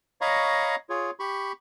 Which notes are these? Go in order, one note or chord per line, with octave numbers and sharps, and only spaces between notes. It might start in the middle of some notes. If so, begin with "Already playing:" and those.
C#5 D#5 F5 A#5 B5 C#6
F4 G#4 C#5
G4 B5 C#6